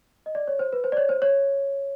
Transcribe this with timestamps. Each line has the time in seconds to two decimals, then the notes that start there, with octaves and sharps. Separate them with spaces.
0.26 D#5
0.35 D5
0.48 C#5
0.59 C5
0.73 B4
0.84 C5
0.92 D5
0.97 C#5
1.09 C5
1.22 C#5